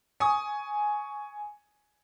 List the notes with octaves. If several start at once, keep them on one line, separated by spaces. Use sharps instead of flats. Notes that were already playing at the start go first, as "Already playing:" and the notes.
G#5 C#6 D#6